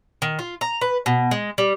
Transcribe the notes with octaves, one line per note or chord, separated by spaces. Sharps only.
D#3
F4
A#5
B4
B2
G#3
G3